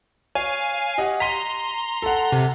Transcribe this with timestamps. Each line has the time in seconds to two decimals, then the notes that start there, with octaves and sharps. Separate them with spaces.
0.35 C#5 F5 G#5
0.98 G4 D#5 F#5
1.20 A#5 C6 B6 D#7
2.02 A4 F#5
2.32 C3